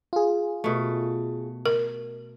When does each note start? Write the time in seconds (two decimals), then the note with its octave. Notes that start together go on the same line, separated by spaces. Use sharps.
0.13 F4 G#4
0.64 B2 A3
1.66 A#4